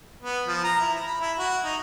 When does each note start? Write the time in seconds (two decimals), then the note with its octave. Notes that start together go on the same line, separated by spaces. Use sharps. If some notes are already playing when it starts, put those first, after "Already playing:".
0.23 B3
0.47 F3
0.64 A#5
0.80 E4
1.06 B5
1.21 E4
1.38 F#4
1.64 D#4